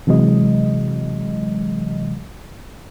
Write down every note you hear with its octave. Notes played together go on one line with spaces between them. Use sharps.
C3 E3 F#3 G#3 D#5